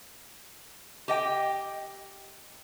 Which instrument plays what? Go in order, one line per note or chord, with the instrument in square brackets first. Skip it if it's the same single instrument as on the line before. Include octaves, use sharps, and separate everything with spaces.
[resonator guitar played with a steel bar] G4 D#5 G5